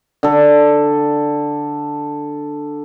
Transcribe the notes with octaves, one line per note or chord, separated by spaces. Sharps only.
D3 A4